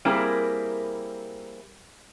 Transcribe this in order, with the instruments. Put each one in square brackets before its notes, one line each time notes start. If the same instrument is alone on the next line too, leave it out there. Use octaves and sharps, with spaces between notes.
[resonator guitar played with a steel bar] G3 A#3 C4 E4 G#4 A#4